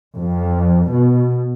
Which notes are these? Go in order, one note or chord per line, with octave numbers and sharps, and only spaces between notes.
F2
B2